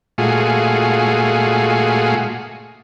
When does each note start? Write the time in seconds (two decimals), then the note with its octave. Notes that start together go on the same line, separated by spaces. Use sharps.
0.18 A#2 G#3 A3 F4 F#4 G#4